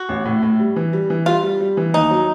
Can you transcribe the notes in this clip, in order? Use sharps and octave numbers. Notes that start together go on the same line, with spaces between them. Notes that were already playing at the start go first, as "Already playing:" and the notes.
Already playing: F#4
A1
A2
A2
G3
E3
G3
E3
G3 F4
G3
G3
E3
D#2 D#4
F#3